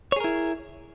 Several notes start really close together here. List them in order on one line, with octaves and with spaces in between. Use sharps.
C#5 G#4 A#4 E4